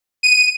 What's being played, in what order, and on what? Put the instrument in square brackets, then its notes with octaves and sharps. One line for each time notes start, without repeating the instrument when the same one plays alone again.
[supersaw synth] D#7